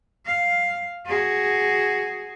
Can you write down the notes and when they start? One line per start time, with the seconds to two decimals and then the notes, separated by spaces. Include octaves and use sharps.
0.26 F5
1.06 F#4 G#4